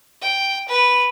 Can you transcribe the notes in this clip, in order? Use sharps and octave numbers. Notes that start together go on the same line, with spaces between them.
G5
B4